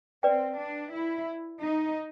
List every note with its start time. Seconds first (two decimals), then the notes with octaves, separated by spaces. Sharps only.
0.23 C4 B4 D5 G5
0.58 D4
0.92 E4
1.60 D#4